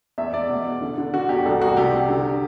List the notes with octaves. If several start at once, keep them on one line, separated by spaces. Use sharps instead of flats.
E2 E5
E2 D5
B2
E2
D3
D3
D3 F#4
E2 G4
C2 A4
C2 F#4
C3 G4
C3
D3